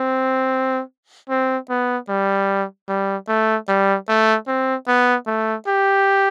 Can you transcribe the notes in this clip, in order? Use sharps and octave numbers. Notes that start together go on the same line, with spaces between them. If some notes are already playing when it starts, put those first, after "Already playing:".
Already playing: C4
C4
B3
G3
G3
A3
G3
A3
C4
B3
A3
G4